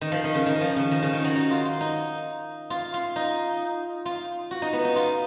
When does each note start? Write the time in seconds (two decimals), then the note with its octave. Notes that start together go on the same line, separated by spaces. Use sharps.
0.01 D#3
0.12 F3
0.24 D#3
0.35 C#3
0.46 D#3
0.61 F3
0.76 C#3
0.91 D#3
1.03 C#3
1.13 D#3
1.24 F#3
1.36 D#4
1.51 F4
1.65 F4
1.81 D#4
2.70 F4
2.94 F4
3.16 D#4
4.05 F4
4.51 F#4
4.62 D#4
4.73 B3
4.85 D#4
4.96 F4